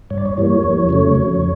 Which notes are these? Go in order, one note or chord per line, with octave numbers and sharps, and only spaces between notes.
G2 C#5
D5
C#5
E3 G3 A#3 C#5
F2
C#3 F#3 A3
F2